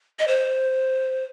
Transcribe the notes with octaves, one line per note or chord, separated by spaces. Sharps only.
D#5
C5